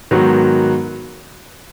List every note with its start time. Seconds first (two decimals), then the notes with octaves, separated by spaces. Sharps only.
0.11 G#2 D#3 F#3 B3 F#4